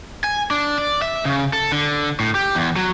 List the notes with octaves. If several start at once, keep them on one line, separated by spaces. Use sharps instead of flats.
G#5
D4
D5
E5
C#3
A4
D3
A2
G4
E2
F#3